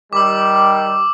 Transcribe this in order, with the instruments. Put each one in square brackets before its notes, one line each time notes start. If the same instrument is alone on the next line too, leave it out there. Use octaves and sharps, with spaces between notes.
[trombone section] D#3 G3 [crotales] D6 E6